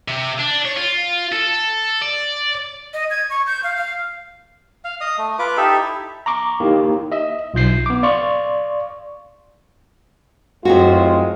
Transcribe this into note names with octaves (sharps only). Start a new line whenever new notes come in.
C3
D4
C#5
F4
A4
D5
D#5
G#6
C#6
G6
F5
F5
F5
D#5 D#6
A3
F4 B4 D6
D#4 G4 A4 E5
E4
A#5 C#6 D6
A#3 D#4 E4 G4
D#5 E5
B1 F4 G6 C7
B3 D6
D5 F5 C6 C#6
F#2 A2 G#3 C4 F4 F#4